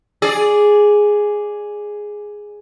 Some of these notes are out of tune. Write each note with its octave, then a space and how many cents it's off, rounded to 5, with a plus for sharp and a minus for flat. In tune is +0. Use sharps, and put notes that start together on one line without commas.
G#4 +0 D5 +0